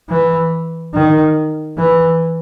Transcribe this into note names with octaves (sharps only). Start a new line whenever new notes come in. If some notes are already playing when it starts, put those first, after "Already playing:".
E3
D#3
E3